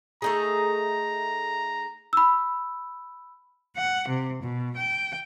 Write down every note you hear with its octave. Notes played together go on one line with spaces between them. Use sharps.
A3 D#4 G#4 A#5
B5 E6
F#5
C3
B2
G5